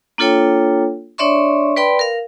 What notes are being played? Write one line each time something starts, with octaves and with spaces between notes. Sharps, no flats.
A#3 D4 F4 A4 C#5 G5
D4 C#5 D5 E5 C6 C#6
B4 D5 G5 B5 C6
A#4 F5